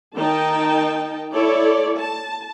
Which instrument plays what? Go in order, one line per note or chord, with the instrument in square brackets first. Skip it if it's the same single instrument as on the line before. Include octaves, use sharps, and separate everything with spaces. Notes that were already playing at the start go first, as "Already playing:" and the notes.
[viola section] D#3 D#4 G5 A5
E4 A4 C#5 D5
A5